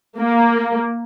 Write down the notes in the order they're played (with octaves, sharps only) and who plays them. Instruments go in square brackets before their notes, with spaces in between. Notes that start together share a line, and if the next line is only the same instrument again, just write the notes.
[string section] A#3